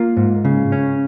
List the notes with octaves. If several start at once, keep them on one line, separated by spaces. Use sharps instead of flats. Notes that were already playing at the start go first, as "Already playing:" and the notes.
Already playing: A#3 F4
G#2
C#3
C#4